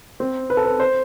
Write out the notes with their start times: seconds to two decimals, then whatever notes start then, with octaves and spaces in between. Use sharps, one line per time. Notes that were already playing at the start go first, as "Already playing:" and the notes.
0.20 C4
0.50 B4
0.57 A4
0.65 B4
0.80 C5